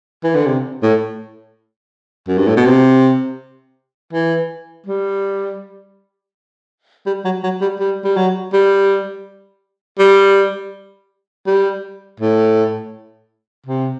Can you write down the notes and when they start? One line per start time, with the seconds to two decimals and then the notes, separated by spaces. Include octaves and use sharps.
0.24 E3
0.35 D3
0.46 C3
0.83 A2
2.28 F#2
2.38 G2
2.47 A2
2.56 B2
2.66 C3
4.13 E3
4.86 G3
7.06 G3
7.25 F#3
7.43 F#3
7.61 G3
7.80 G3
8.04 G3
8.16 F#3
8.53 G3
9.99 G3
11.47 G3
12.20 A2
13.67 C3